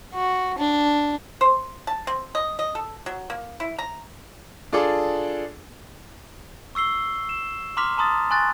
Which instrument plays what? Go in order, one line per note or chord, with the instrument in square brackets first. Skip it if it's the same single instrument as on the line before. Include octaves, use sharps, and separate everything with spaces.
[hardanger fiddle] F#4
D4
[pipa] C5
A5
C4
D#5
D#5
A4
F#3
A#3
E4
A#5
[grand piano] D4 F4 G#4 A4 D6
[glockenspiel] C#6 E6 C7 G7
E7
A#5 C6 D6 F6 B6 F7
A5 A#5 C6 D#6 A6
G#5 C6 C#6 F#6 A6